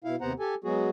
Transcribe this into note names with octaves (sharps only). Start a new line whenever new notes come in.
B2 E4 F5
D#2 C3 B3 C5 F#5 A#5
G4 A4 G#5
F#3 G#3 B3 F#4 G#4